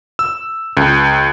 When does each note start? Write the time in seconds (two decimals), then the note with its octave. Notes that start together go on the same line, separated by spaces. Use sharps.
0.19 E6
0.77 C#2